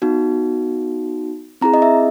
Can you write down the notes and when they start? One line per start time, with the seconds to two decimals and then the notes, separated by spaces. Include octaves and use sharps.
0.02 B3 D#4 F#4
1.61 C4 E4 G#4 A#5
1.74 D#5
1.82 E5